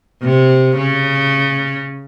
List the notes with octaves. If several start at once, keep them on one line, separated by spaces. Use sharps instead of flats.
C3
C#3